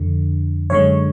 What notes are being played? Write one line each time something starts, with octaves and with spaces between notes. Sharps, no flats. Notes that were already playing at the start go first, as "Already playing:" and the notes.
Already playing: F2 D3
F#2 D3 G#3 C#5